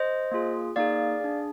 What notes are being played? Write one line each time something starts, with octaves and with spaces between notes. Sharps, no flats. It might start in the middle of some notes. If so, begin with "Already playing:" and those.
Already playing: C5 D#5
A#3 F4 G#4
A#3 D#4 G#4 D5 F5
D4 G#4